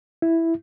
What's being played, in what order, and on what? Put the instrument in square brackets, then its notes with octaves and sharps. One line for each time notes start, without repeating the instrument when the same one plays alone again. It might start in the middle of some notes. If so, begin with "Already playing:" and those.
[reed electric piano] E4